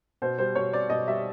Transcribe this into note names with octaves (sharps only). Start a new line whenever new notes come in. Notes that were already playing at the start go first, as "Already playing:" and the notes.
B2 C5
G3 C5
B2 C#5
C4 D5
B2 D#5
G3 E5